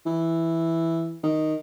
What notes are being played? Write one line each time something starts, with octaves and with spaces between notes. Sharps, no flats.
E3
D#3